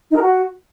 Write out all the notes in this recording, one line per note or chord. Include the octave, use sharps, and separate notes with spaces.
D#4
A#4
F#4